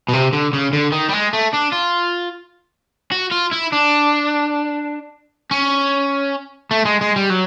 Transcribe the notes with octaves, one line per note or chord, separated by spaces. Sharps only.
B2
C3
D3
C#3
D3
D#3
G3
G#3
A3
D4
F4
F#4
F4
E4
D4
C#4
A3
G#3
G#3
G3
F#3